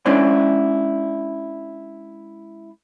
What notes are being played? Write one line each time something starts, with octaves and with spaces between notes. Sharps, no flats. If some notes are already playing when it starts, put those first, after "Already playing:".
G#3 C#4 D4 E4 C5 D5